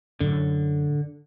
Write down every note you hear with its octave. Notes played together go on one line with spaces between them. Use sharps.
F#2 A2 D3